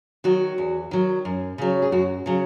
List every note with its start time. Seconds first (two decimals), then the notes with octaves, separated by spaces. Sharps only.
0.24 D#3 F#3 F#4
0.58 E2
0.91 D#3 F#3
1.25 F#2
1.58 C#3 F#3
1.82 G#4
1.92 F#2 F#4
2.26 C#3 F#3